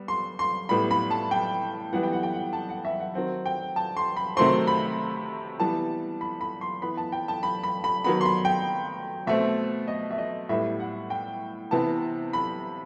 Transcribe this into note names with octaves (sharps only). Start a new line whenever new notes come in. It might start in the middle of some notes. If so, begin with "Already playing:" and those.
Already playing: G3 B3
C6
C6
A2 G3 B3 B5
B5
A5
G5
E3 G3 B3 F#5
G5
F#5
G5
F#5
A5
F#5
E5
F#5
D#3 F#3 C4 F#5
G5
A5
C6
B5
C3 D#3 F#3 A3 C4 C6
B5
E3 G3 B3 A5
B5
B5
C6
E3 B3 B5
A5
G5
A5
B5
B5
B5
D#3 F#3 B3 B5
C6
B5
G5
B2 A3 C4 E5
D#5
E5
D#5
A2 G3 B3 E5
F#5
G5
C3 E3 B3 A5
B5